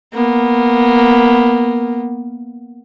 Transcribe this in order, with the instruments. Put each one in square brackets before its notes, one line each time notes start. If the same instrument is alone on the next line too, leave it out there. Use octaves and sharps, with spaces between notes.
[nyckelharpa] A#3 B3